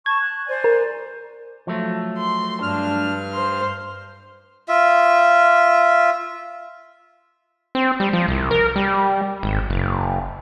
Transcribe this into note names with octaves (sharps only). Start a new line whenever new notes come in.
A5 C#6 G#6
F#6
C5 D5 G#5
A#4
F3 F#3 A3
C6
G2 D4 F6
C5 C6
F4 E5
C4
G3
F3
C2
A#4
G3
G#1
F#1